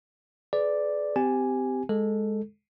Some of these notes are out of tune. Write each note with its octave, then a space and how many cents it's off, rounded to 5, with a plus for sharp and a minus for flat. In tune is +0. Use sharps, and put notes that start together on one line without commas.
G#4 +40 B4 +25 D5 +0
C4 -30 G4 +0 G#5 +0
G#3 +0 A4 +0